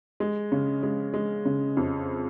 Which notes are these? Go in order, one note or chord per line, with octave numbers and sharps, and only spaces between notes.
G#3
C#3
G#3
G#3
C#3
F2